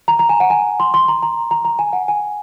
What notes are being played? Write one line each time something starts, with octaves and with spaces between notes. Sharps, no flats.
A#5
A#5
G#5
F#5
G#5
C6
C6
A#5
A#5
A#5
A#5
G#5
F#5
G#5